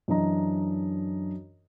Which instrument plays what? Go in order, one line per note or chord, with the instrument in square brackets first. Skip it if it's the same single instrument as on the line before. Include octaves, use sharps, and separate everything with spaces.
[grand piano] F#2 E3 D4 D#5 A#5